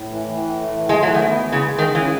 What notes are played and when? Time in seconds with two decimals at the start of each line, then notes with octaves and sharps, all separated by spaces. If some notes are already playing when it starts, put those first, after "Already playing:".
Already playing: A2
0.10 E3
0.27 E3
0.43 A2
0.60 A3
0.77 E3
0.89 G#3
0.94 A3
1.03 F#3
1.10 D#3 E3
1.27 B3
1.44 G#3
1.52 C#3
1.61 G#3
1.78 D#3 G#3
1.95 C#3 E3